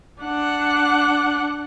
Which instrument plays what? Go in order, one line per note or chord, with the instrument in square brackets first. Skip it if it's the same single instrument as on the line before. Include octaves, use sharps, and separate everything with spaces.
[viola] D4 F#5